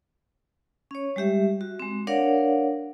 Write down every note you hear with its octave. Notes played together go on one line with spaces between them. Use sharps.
C#4 C#5
G3 G#3 G4 E5
F#4
G#3 C4
D4 A#4 C#5 D5 F5 F#5